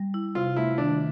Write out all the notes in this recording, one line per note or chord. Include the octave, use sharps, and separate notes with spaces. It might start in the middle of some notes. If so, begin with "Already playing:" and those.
Already playing: G3
E4
C3 F4
A3 E4
D#3 D4